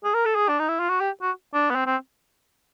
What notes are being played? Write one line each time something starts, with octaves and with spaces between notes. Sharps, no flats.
G#4
A#4
A4
G#4
D4
D#4
E4
F4
F#4
G4
F#4
D4
B3
C4
C4